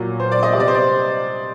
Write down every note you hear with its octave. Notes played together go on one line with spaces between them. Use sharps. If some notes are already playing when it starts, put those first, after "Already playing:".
Already playing: A#2 F#3
C5
D5
D#5
C3 G3 D5 D#5
C5
D5